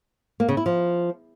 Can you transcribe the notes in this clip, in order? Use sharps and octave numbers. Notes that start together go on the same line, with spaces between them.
A#3
C#3
E4
F3